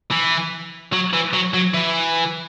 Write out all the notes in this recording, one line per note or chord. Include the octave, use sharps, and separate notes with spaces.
E3
F#3
E3
F#3
F#3
E3